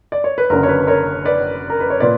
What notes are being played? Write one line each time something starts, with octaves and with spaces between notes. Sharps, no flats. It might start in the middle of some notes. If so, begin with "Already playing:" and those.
D5
C#5
B4
F#1 F#2 D3 A#4
C#5
B4
A#4 C#5
B4 D5
A#4
B4
C#5
A#2 B4 D5